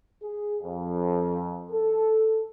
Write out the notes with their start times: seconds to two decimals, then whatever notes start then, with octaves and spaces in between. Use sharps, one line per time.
0.23 G#4
0.62 F2
1.72 A4